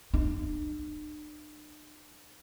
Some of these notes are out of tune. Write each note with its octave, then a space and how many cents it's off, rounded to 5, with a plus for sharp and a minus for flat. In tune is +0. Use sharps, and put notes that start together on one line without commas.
D4 +45